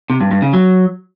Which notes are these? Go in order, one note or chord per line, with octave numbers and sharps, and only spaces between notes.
C3
G2
G2
C#3
F#3